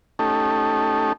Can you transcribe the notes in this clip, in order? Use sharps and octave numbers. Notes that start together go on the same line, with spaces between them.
A3 C#4 D#4 G4 A4